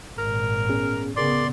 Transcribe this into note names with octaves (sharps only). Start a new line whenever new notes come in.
G#1 A#2 A#4
B3 C#4 G#4
C#3 B3 G#4 A#4 D5 C6 D6